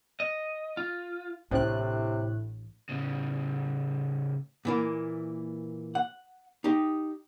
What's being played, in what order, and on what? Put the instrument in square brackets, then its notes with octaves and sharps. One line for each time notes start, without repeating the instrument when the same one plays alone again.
[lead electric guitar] D#5
F4
[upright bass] A1 D4 [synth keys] A2 F#6 [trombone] C3 [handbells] C#4 C5 G5
[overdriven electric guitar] A2 C#3
[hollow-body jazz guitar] A#2 E3 A#3
F#5
D#4 G4